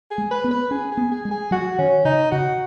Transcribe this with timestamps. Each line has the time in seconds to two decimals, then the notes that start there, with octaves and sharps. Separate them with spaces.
0.11 G#4
0.18 G#3
0.31 B4
0.44 B3
0.51 B4
0.71 C#4 G#4
0.92 G#4
0.97 B3
1.11 G#4
1.25 G#3
1.31 G#4
1.51 F#3 F#4
1.78 D#3 C#4
2.05 C#3 D#4
2.31 C#3 F#4